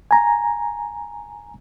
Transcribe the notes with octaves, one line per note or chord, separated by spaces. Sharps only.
G#5 A#5